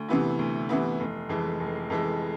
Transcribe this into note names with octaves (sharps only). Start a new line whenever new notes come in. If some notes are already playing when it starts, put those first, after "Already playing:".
Already playing: D2
C3 E3 B3 E4
D2
C3 E3 B3 E4
F1
F2 E3 G#3
F1
F2 E3 G#3